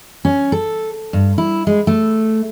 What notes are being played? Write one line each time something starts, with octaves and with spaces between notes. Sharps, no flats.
C#4
A4
G2
E4
G#3
A3